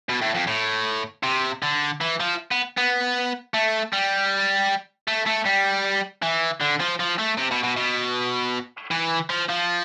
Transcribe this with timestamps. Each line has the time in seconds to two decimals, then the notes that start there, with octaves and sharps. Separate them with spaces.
0.09 B2
0.22 A2
0.35 F2
0.47 A2
1.23 C3
1.62 D3
2.01 E3
2.20 F3
2.51 B3
2.77 B3
3.54 A3
3.93 G3
5.08 A3
5.27 A3
5.46 G3
6.23 E3
6.61 D3
6.80 F3
7.00 F3
7.19 A3
7.38 C3
7.51 B2
7.63 B2
7.77 B2
8.91 E3
9.30 F3
9.49 F3